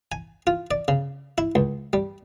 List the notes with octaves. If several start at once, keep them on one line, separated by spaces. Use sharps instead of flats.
G#5
F4
D5
C#3
E4
C#2
G3